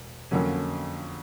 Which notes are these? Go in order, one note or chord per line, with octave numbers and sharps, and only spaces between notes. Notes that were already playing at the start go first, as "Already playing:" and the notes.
Already playing: E1
F2 D3 F#3 A#3 C#4